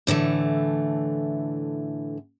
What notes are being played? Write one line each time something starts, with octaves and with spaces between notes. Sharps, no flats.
A2 D3 E3 A3